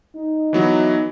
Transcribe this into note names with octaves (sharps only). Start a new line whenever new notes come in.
D#4
E3 F#3 B3